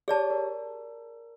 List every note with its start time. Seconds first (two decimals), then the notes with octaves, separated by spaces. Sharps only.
0.08 G4 G#4 C#5 D5 A5
0.30 A#4